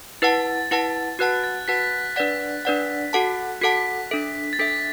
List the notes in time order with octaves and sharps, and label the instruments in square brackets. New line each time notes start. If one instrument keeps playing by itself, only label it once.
[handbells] E4 B4 F#5 A5 [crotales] A6
[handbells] E4 B4 F#5 A5
[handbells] F#4 B4 F#5 A5 [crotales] F#6
[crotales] A6
[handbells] F#4 B4 F#5 A5 [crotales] B6
[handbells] D4 B4 D5 F#5 [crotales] B6
[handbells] D4 B4 D5 F#5
F#4 A4 F#5 A5
[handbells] F#4 A4 F#5 A5 [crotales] B6
[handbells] D4 A4 E5
[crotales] A6
[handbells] D4 A4 E5 [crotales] B6